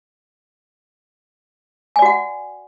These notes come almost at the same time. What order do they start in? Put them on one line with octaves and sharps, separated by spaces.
G#5 D5 F#4 F#5